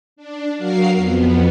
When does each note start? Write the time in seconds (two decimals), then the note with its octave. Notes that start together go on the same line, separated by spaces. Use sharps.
0.16 D4
0.58 F#3 F#4 A#4 F5 C7
0.93 F2 B3